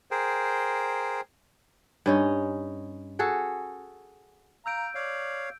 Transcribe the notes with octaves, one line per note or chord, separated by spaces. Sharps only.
G#4 A#4 C5 G5
G2 C#4 D#4
F#4 G#4 A4
F5 A#5 E6 G6 D7
C#5 D5 F5